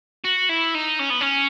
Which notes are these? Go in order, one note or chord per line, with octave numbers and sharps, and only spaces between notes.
F#4
E4
D#4
C#4
B3
C#4